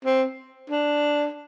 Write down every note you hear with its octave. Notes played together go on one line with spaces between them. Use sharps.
C4
D4